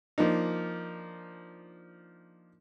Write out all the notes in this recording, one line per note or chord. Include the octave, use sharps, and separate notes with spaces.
F3 A#3 D4 D#4